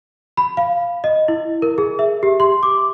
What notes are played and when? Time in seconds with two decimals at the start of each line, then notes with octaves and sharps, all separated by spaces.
0.37 B5
0.57 F5
1.04 D#5
1.28 E4
1.62 A#4
1.78 G#4
1.99 E5
2.23 G4
2.40 C6
2.63 D6